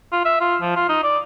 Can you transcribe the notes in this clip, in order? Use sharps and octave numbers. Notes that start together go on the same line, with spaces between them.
F4
E5
F4
F3
F4
D#4
D5